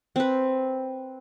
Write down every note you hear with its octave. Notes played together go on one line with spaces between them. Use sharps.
C4 B4